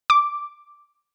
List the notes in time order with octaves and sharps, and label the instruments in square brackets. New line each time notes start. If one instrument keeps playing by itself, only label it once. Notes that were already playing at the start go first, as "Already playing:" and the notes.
[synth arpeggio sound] D6